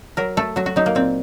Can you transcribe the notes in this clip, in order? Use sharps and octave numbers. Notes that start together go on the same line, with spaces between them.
F#3 A#4
A3 A4
F#3 F#4
F#4
F#3 D#4
A#3
A#2 C4